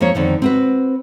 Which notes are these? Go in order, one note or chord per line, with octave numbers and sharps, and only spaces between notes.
F2 F3 A#3 C#5
F2 D3 D#3
C4 F#4 B4